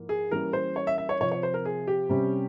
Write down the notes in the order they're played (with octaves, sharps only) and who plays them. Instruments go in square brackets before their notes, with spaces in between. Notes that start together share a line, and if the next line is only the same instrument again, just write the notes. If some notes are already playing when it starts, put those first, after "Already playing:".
Already playing: [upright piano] G#2 F3 A#3 E4
[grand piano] G#4
[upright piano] E3 G3 A#3 C#4 [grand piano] A#4
[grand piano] C5
C#5
E5
E5
C#5
[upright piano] C3 F3 C4 [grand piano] C#5
[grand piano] C#5
C5
A#4
G#4
G4
[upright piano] C3 G3 C#4